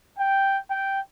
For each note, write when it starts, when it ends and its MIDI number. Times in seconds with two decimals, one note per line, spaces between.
0.19 0.59 79
0.69 1.00 79